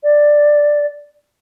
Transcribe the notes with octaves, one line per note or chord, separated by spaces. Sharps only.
D5